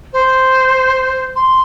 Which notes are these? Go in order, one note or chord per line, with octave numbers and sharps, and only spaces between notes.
C5
C6